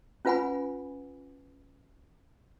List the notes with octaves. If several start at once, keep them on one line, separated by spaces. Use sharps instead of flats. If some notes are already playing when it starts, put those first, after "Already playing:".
C#4 F4 B4 F#5 G#5 B5